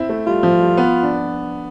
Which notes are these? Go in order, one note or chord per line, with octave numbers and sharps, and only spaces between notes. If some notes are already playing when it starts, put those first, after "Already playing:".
Already playing: C4 E4
A3
G3 F4
F3
G3
B3
D4